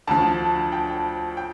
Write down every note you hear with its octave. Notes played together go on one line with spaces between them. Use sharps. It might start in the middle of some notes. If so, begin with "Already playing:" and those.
D2 D3 F3 A5
G5
G5